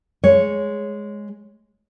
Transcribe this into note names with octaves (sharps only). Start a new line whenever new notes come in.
G#3 C#5